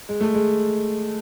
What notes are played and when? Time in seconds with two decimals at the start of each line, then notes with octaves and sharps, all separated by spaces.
0.09 G#3
0.21 A3
0.34 G#3